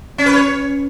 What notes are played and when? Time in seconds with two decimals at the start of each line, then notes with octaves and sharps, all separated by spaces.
0.18 C#4
0.26 B4
0.34 C#5